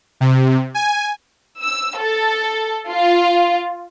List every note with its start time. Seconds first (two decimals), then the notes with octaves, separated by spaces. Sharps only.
0.21 C3
0.74 G#5
1.62 E6
1.99 A4
2.90 F4